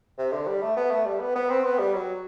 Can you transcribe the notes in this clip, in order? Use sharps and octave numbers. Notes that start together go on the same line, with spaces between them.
C3
D3
G3
A3
B3
A3
G3
B3
B3
C4
B3
G3
F#3